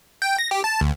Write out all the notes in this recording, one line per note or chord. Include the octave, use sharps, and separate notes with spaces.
G5
A#6
G4
A5
D2